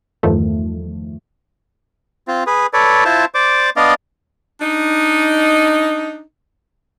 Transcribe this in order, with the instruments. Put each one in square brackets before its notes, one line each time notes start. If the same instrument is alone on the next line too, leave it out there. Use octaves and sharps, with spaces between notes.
[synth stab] E2 G2 D#3 F3 A3
[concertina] C4 F4
G#4 B4
A4 B4 C#5 D5
E4 F4 C5 A5
C5 D5 D6
B3 D4 D5 D#5 F5
[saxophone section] D4 D#4